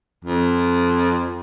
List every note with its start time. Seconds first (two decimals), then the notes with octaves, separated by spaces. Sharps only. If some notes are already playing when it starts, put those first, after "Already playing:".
0.24 F2